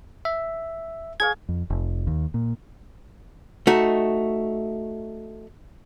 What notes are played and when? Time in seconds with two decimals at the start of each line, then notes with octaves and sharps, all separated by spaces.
0.25 E5
1.20 G#4 C#5 F5 G#6
1.49 F2
1.70 F1
2.07 D#2
2.34 A#2
3.67 A3 D#4 F#4